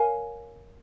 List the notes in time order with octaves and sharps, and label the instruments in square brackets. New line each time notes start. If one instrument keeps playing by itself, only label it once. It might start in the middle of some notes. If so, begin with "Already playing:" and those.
Already playing: [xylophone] A#4 C#5 F5 G#5